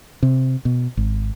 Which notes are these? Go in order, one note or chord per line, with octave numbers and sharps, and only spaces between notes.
C3
B2
G#1